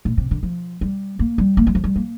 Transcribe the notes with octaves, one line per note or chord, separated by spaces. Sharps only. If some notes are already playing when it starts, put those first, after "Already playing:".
A#2
C3
D3
F3
G3
A#3
G3
A#3
G3
F3
G3
A#3